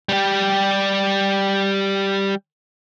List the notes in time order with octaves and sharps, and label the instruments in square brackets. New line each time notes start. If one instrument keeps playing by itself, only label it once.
[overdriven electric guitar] G3 G4